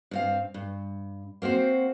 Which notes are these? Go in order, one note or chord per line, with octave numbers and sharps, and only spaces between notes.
G2 C4 F5
G2
A#3 C4 F#4 C5